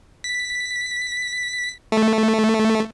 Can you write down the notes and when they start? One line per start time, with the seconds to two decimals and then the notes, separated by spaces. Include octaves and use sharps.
0.24 B6
1.92 A3